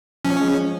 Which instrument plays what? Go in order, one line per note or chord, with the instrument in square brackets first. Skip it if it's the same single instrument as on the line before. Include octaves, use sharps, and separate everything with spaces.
[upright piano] F3 [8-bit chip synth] C#4
[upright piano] G#3